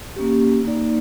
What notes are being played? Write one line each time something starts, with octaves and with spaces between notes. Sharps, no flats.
A#3 C#4 G4
A#3 D#4 D5